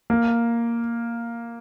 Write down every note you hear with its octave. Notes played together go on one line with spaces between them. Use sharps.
A#3